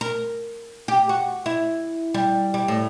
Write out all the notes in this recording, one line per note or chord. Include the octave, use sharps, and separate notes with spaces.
A#4
G4
F#4
E4
G3
G3
A2